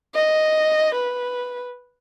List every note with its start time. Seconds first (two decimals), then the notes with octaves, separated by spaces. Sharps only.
0.15 D#5
0.95 B4